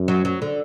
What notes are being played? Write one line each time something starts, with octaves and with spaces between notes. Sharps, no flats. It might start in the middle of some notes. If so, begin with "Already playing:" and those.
Already playing: F#2
F#3
F#3
D3